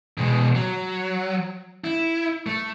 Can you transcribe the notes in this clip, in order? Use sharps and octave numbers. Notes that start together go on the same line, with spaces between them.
B2 G#3
F#3
E4
A3